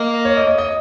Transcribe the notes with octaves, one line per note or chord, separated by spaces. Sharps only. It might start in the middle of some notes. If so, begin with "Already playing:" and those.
Already playing: A#3 D#5
C#5
D#5
D#5
D#5